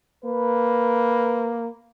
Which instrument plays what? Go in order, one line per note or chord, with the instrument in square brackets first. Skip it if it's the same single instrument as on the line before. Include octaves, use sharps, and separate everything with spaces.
[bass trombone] A#3 [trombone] B4